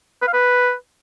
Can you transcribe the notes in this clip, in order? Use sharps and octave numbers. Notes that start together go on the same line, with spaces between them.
B4
F5
B4